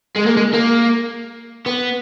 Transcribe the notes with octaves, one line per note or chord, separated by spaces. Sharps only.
G#3
A#3
G#3
A#3
B3